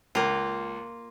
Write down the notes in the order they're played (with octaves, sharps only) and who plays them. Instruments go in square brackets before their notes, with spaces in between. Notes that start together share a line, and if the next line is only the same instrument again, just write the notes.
[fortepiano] C#2 [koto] A#3 F4